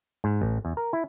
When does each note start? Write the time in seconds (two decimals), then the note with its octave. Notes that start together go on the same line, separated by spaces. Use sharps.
0.24 G#2
0.42 A1
0.65 E2
0.77 A#4
0.93 E4